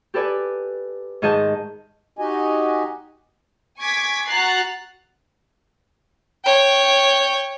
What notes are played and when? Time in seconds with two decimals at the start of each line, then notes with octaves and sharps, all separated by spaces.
0.14 G4 A4 B4 D5 G#5
1.22 G#2 D#3 G#4 D#5 A5 G6
2.19 D#4 F#4 G4 D#5 G#5
3.78 G#5 C#6 D6 G#6 B6
4.27 F#4 A#5 F#6 A6 C7
6.45 C#5 G5